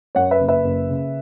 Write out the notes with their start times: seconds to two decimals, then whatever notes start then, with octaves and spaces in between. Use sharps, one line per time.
0.15 F#2 C#5 F#5
0.31 B4 E5
0.41 F#1
0.48 B4 E5
0.64 F#1
0.90 C#3